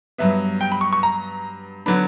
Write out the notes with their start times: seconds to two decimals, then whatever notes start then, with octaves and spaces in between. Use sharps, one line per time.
0.18 G2 F#3 B3 E5
0.61 G5
0.72 B5
0.81 C#6
0.93 C#6
1.03 A#5
1.86 D3 F#3 B3 D4 B5